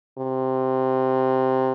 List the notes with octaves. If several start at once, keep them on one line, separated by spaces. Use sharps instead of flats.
C3